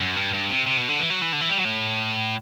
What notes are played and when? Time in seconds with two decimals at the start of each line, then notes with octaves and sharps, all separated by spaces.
0.01 F#2
0.16 G2
0.34 G2
0.50 C3
0.67 C3
0.77 B2
0.89 D3
0.99 E3
1.10 F#3
1.22 E3
1.33 D3
1.41 E3
1.49 G3
1.57 F#3
1.65 A2